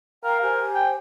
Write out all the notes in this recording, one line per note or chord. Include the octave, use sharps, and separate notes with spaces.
A#4 F5 G5 A#5
G4 C5 G#5
G5